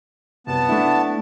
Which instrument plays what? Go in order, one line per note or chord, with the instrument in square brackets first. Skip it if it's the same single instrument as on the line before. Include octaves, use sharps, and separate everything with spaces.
[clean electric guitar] C2 F#2 [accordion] B3 A5
[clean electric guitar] A3 D4 E4